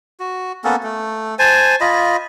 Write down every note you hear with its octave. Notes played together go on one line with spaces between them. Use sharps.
F#4
A#3 B3 C#4 A4
A3
C5 G#5 A5
F4 D#5 B5